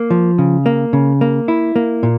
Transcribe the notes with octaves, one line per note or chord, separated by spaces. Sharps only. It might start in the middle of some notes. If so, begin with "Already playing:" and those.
Already playing: A#3
F3
C#3
A#3
C#3
A#3
E4
A#3
A#2